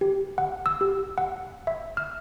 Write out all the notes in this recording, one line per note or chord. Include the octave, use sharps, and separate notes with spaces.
G4
F#5
E6
G4
F#5
E5
F6